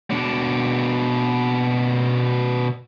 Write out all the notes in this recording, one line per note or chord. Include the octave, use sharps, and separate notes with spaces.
B2 D4